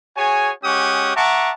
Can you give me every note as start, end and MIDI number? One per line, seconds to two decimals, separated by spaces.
0.17 0.52 66
0.17 0.52 68
0.17 0.52 73
0.17 0.52 80
0.64 1.12 56
0.64 1.12 61
0.64 1.12 67
0.64 1.12 78
0.64 1.12 85
0.64 1.12 87
1.16 1.51 76
1.16 1.51 78
1.16 1.51 81
1.16 1.51 82
1.16 1.51 85
1.16 1.51 86